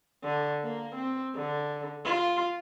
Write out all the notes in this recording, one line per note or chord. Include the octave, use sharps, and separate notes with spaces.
D3
A#3
C4
D3
F4